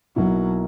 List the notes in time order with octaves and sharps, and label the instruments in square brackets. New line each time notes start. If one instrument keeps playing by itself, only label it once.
[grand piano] B1 B2 A#3 E4 A#4 [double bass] F#3